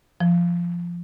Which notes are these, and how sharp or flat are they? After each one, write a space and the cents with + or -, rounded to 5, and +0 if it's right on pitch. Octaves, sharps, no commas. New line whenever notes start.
F3 -10